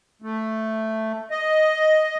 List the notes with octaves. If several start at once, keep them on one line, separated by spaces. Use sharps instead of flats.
A3
D#5